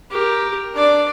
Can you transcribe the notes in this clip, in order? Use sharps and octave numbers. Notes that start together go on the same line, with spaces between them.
G4 A#4
D4 D5